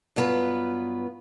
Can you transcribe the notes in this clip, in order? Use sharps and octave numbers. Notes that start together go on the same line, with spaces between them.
G2 F#3 B3 F4 B4